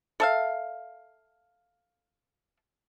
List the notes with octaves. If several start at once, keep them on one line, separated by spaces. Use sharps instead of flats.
A4 E5 F5